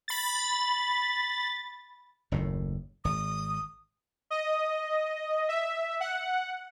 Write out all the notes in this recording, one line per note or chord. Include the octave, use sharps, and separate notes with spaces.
B5 A6
F#1 D#2 A2
G#1 D#6
D#5
E5
F#5